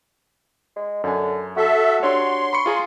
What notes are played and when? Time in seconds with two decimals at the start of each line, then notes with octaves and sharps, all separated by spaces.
0.76 G#3
1.04 F#2 D3 G#5
1.57 F#4 A4 E5
2.03 D4 G4 C#5 C6
2.53 B5 C#6 C#7
2.66 F4 G#4 A#5